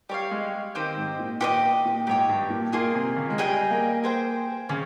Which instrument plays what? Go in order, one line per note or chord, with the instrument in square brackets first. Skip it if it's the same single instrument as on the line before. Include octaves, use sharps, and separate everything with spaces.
[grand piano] G3 [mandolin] G4 C#5 F5
[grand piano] G#3
[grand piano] D#3 [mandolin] C4 G4 C5 D#5
[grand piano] G#2
A#2
[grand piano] A#2 [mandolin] G4 C5 D#5
[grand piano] A#2
[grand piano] G#2 [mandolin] G4 C#5 G5
[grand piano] G2
A#2
[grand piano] A#2 [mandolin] A#3 F4 G#4 D#5
[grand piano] C3
C#3
G#3
[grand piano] G3 [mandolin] G#4 D#5 G5
[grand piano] A#3
[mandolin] G#4 C5 G5
[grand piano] C#3 [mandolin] C#4